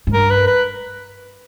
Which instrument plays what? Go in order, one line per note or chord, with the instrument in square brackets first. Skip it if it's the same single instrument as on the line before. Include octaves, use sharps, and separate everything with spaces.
[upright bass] G#2
[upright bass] G2 [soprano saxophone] A#4
[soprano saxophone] B4
B4